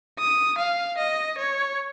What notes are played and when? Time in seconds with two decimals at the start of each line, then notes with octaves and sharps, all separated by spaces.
0.19 D#6
0.58 F5
0.98 D#5
1.38 C#5